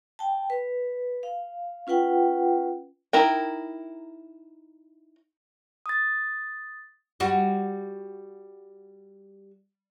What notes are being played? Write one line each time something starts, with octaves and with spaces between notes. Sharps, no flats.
G5 A5
B4
F5
C#4 F4 B4 F#5 G5
D#4 E4 A#4 G5
D#6 A6
G3 F#4